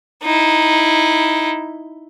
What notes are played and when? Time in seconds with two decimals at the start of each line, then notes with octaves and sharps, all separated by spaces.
0.23 D#4 E4